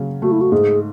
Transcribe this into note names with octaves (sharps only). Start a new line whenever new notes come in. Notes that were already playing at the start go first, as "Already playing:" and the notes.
Already playing: C#3 F#3
A3 F#4
E4
F#4
G#2 G#4